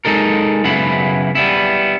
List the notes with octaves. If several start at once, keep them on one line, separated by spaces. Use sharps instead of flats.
G#3 D#4 A4 A#4
F#2 C#3 B3 E4 B5
G3 B3 E4